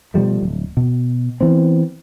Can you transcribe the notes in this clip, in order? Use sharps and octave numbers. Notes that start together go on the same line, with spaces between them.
B2 F3 G3 A3
D1
B2
E3 B3 C4